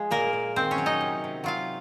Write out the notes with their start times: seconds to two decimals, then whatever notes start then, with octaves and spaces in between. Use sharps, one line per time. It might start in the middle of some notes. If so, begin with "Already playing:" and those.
Already playing: F3 G#3 G#4
0.11 A#2 A#3 A#4
0.33 A#2
0.56 D#3 C4 C5
0.71 C#4 C#5
0.78 F#3
0.86 D#4 D#5
1.01 C3
1.24 C3
1.44 F#3 F4 F5